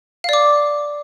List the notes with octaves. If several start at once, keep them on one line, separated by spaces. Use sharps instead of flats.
D5 F5 D6